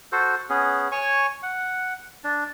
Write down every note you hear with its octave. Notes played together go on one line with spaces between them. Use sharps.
F#4 A4 C5
B3 C#4 G#4
C#5 G#5 C#6
F#5
D4